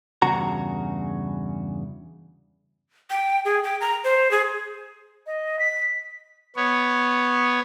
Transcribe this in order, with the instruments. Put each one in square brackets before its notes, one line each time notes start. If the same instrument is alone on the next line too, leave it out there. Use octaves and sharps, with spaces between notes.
[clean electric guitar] E2 G2 C#3 F#4 A#5
[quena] G5
G#4
G5
A#5
C5
G#4
[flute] D#5
B6
[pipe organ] B3 C#5